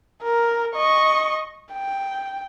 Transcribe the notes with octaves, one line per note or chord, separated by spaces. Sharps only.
A#4
D#5 C#6
G5